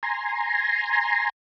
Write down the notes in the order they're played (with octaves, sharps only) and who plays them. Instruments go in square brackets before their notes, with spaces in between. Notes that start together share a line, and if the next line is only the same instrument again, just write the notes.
[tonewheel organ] G#5 A#5 C6